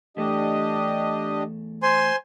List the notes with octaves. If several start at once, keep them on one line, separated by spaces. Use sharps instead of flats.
E2 A3 D4 G4 D#5
C5 G#5 C6